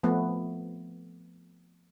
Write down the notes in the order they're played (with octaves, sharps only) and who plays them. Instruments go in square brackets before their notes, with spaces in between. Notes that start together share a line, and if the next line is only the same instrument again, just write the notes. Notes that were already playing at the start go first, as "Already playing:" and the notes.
[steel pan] F3 A3 B3